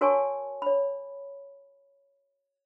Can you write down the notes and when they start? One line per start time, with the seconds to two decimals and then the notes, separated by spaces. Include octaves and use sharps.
0.01 F#4 A#4 C#5 G#5 A5 C#6
0.62 C#5 B5